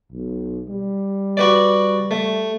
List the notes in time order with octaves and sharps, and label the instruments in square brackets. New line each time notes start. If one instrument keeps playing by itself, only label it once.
[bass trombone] B1
G3
[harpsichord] F#4 B4 D5
A3